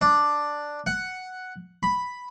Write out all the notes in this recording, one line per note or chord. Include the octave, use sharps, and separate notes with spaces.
D4
F#5
B5